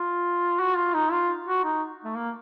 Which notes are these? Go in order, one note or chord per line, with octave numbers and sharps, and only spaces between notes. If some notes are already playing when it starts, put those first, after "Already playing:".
Already playing: F4
F#4
F4
D#4
F4
F#4
D#4
A3
A#3